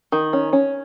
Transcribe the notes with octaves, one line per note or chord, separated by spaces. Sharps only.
D#3
C#4
C#4